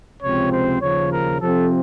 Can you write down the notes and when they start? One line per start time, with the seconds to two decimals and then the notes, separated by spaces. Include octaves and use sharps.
0.22 C#2 C3 F3 C4 C#5
0.52 C5
0.81 D#2 C#3 F3 C#5
1.12 A#4
1.41 C3 F3 C4 A4